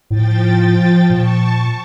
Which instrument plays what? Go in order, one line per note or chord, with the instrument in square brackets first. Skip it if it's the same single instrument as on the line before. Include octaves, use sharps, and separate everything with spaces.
[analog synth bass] A2 [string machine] F3 G5 A6
[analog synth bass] A#2 [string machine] A5 C#6